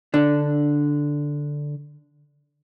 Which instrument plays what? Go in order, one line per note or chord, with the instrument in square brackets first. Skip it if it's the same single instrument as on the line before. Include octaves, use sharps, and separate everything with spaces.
[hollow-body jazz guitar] D3 D4